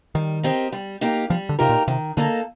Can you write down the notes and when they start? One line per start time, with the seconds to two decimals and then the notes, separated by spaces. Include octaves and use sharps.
0.15 D#3 G3
0.43 C4 G4 A#4 D#5
0.72 G3
1.01 A#3 D#4 G4 A#4
1.30 F3 G3
1.49 D3
1.59 C3 A#3 D#4 G4 A#4
1.69 A#2
1.88 C3 D#3
2.17 D3 A#3 D#4 A4